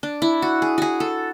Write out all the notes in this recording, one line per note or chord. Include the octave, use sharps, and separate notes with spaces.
D4
E4
F#4
G#4
F#4 G#4
A4